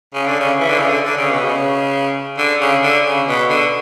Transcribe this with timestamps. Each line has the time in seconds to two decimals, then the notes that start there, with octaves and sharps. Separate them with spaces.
0.14 C#3
0.27 D3
0.40 C#3
0.59 E3
0.69 D3
0.79 C#3
0.89 D3
1.04 D3
1.17 C#3
1.31 B2
1.45 C#3
2.38 D3
2.61 C#3
2.82 D3
3.05 C#3
3.27 B2
3.50 D3